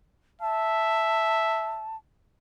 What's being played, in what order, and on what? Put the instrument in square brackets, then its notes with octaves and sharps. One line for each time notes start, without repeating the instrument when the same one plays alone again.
[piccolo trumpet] E5 [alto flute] A5